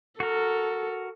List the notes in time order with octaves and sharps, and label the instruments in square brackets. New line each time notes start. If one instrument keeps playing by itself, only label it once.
[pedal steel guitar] F#4 A#4 [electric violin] A4